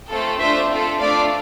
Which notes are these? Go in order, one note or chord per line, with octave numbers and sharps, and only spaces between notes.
A3 C4 F4 A4
A3 D4 F4 C5 E5
C4 F4 A4
A3 D4 F4 D5 F5